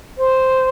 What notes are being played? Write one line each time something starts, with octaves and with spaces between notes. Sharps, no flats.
C5